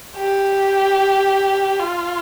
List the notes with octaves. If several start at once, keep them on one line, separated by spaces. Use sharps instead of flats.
G4
F4